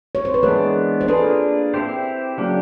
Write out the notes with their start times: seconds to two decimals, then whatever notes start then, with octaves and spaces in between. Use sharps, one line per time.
0.15 C#5
0.25 C5
0.34 B4
0.43 E3 G#3 B3 D4 G#4 A#4
1.01 C5
1.08 A#3 D4 F4 G#4 A4 B4
1.74 C4 E4 G4 C5
2.38 C#3 F#3 A#3 D4 G4